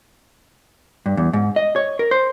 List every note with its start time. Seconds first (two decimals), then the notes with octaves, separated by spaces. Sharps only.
1.06 G2
1.17 E2
1.33 G#2
1.56 D#5
1.76 C#5
1.99 A#4
2.11 C5